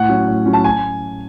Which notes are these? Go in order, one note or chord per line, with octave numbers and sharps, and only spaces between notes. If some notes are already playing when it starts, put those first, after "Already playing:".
Already playing: A2 F#5
F#3 C#4
A2
F#3 C#4
A5
G#5